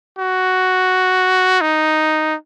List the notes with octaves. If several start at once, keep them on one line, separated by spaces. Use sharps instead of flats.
F#4
D#4